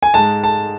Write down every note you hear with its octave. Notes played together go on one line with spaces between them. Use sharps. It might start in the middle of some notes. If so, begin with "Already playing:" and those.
G#5
G#2 G#3 A5
A5